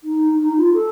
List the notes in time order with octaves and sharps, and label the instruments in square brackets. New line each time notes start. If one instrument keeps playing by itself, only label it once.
[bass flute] D#4
D#4
F4
A4